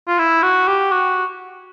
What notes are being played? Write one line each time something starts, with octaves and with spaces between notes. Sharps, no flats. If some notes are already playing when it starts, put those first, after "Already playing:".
F4
E4
F#4
G4
F#4